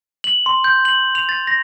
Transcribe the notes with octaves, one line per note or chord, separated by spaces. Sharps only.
F#7
C6
G6
F#7
F7
A6
A#6